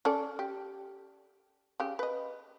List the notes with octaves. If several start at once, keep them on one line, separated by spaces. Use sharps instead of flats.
C#4 A4 D5
G4
C#3 G4
B4 D#5